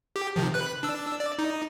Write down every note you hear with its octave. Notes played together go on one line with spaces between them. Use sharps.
G4
C3 D#3 F3
B4 F#6
D4 E6
D5
D#4